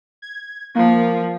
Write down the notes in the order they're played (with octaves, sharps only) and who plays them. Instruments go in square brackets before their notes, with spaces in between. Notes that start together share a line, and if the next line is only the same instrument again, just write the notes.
[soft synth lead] G#6
[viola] F3 [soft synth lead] A#3